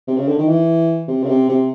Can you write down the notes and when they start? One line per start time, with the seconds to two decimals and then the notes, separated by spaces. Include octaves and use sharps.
0.08 C3
0.17 C#3
0.28 D3
0.38 D#3
0.48 E3
1.08 C3
1.23 C#3
1.28 C3
1.49 C3